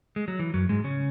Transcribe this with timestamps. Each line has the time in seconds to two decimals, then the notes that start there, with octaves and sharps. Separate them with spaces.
0.16 G#3
0.28 F#3
0.39 E3
0.54 F#2 F#3
0.69 G#2 G#3
0.84 C#3 C#4